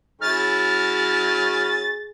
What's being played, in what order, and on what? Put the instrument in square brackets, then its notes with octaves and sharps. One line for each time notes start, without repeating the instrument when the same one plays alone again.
[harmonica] F#3 C#4 E4 [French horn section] G#4 [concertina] F6 [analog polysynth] A6